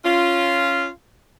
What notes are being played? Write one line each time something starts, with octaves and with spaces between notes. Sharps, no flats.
C#4 F4